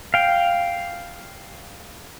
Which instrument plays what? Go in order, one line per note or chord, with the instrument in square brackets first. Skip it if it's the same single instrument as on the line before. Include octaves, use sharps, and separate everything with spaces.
[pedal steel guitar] F5 G5